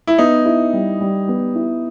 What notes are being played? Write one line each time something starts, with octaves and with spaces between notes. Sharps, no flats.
E4
B3 D#4
E4
G3
G3
B3
E4